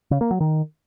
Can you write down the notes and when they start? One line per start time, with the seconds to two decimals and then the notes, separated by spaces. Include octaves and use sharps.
0.11 C#3
0.21 A#3
0.31 F#3
0.40 D#3